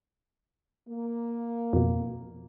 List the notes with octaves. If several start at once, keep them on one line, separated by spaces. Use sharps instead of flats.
A#3
F2 B2